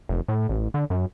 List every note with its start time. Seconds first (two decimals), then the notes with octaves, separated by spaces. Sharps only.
0.09 F1
0.28 A2
0.49 A1
0.74 D3
0.90 F#2